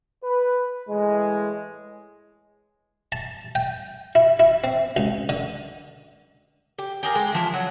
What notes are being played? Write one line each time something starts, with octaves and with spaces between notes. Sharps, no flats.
B4
A2 E3 G#3
A5
G5
E4
E4
C4
C#2
D3
G4
G4 G#4 A#4 F5
G#3 G4
E3 F3 E4
F#3